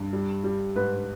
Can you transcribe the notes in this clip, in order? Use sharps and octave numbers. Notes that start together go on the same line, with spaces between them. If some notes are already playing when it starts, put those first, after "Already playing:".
Already playing: G2
G3
G3
G#2 B4